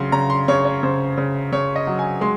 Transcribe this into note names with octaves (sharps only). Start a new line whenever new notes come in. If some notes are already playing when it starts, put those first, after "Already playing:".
Already playing: C#3 F#3 C6
C#3 A#5
C6
C#3 C#5
C#5
C#3 C5
C#3
C#3 C#5
D#5
F#3
G#5
G#3 C6